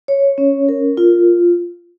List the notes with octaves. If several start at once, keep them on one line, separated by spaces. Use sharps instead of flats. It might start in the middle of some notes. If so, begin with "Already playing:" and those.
C#5
C#4
A#4
F4